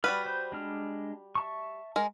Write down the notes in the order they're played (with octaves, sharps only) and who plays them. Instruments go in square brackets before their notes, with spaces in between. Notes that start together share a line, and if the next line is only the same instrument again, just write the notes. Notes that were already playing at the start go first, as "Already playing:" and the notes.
[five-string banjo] G3 F#4 B4 [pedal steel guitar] D5 F6
[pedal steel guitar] C5 G6
G#3 D4 F6
E5 A5 C#6
[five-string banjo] G#3 A#4